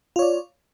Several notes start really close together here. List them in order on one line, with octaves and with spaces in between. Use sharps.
F4 C#5 D5